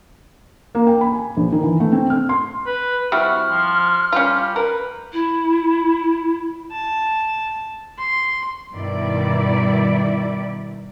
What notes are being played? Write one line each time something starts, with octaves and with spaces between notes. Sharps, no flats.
A#3
G5
B5
G#5
A#1
D#3
E3
A3
C4
F6
C6
B4
G3 C4 E4 F#4 F6
F3
G3 C#4 F4
A#4 B4
E4
A5
C6
G2 B2 D#3 E4 D5